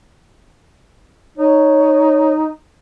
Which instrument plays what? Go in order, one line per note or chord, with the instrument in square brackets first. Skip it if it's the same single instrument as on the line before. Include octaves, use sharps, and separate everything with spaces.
[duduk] D#4 [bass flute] C#5